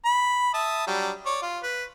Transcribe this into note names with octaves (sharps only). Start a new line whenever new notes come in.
B5
E5 A5 D#6
F#3 G3 D4
C#5 D5
F4
B4